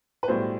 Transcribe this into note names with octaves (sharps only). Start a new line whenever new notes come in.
B4
B1 A2 G3 C5